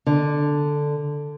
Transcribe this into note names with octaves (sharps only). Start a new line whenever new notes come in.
D3